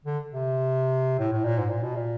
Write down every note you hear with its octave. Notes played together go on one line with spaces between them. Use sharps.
D3
C3
A2
A2
A#2
G#2
A#2
B2
A#2